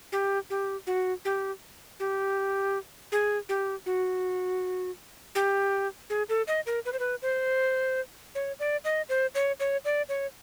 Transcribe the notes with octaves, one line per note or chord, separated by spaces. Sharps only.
G4
G4
F#4
G4
G4
G#4
G4
F#4
G4
G#4
A4
D#5
A#4
B4
C5
B4
C5
C#5
D5
D#5
C5
C#5
C#5
D5
C#5